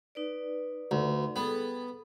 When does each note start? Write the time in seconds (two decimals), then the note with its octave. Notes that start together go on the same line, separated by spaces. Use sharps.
0.15 D#4 B4 D5
0.91 D2
1.36 G3 B3 G#4 A4